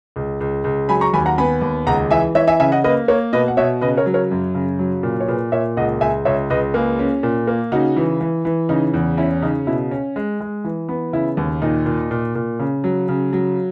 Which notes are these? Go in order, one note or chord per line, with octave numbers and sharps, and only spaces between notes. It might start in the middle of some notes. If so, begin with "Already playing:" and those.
C#2
C#2
C#2
F#3 G#5 B5
A#5 C#6
D#2 G#5 B5
F#5 A#5
B3 G#5 B5
D#2
C#2 F#5 A#5
E3 E5 G#5
E3 C#5 E5
E5 G#5
C#3 E5 G#5
D#5 F#5
A#3 B4 D#5
A#3 A#4 C#5
B2 B4 D#5
F#5
B2 C#5 E5
C#3 B4 D#5
A#4 C#5
F#3
A#4 C#5
F#2
C#3
F#3
A#2
C#5
A#2 G#4 B4
A#2 C#5 E5
C#2 D#5 F#5
C#2 E5 G#5
C#2 C#5 E5
C#2 B4 D#5
A#3 G#4 B4
C#4
A#2
A#3
C#3 D#4 F#4
E3
E3
E3
C#3 D#4
E2
C#4 E4
C#3 D#4
B2 E4
C#4
G#3
G#3
E3
B3
C#3 E4
D#2
A#2 D#4
A#2
A#2
A#2
C#3
F#3
C#3
F#3